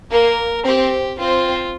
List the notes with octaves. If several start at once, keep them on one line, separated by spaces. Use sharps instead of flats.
A#3 A#4
C4 G4
C4 F4